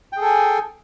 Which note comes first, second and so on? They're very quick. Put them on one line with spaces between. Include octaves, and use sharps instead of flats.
G5 G#4 A4 G#5